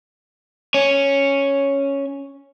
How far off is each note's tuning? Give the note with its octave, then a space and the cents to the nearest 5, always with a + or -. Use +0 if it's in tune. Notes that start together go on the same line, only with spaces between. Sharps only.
C#4 +0 C#5 +0